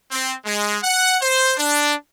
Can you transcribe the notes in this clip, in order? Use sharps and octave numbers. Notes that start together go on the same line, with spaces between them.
C4
G#3
F#5
C5
D4